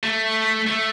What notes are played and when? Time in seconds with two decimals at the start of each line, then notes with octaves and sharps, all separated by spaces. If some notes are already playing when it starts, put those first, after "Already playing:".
0.03 A3
0.68 A3